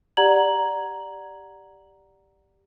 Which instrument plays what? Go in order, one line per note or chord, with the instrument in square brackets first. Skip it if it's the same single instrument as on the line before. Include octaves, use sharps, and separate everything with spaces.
[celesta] G4 D5 F#5 A#5 G#6 F#7